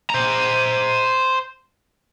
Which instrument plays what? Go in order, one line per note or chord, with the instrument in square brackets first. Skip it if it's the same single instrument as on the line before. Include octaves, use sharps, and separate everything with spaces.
[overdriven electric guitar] C5 A#5